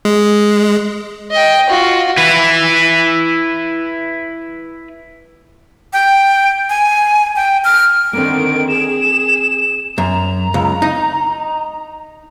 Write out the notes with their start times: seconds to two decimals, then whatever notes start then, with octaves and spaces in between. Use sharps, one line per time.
0.05 G#3
1.31 D#5 G5
1.69 F4 F#4
2.17 E4 B4
5.93 G5
6.69 G#5
7.36 G5
7.65 F6
8.13 D3 D#3 A#3 C4 D7
8.68 G#4 E7
9.98 F#2 A#5
10.54 C#2
10.82 D#4